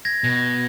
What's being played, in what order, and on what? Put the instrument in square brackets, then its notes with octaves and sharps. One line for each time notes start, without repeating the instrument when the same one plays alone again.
[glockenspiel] G#6 A#6
[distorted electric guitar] B2